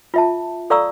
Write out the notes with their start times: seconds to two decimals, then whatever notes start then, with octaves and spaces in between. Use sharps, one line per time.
0.14 F4 E5 A5
0.70 A4 D5 F5 A#5 C#6 E6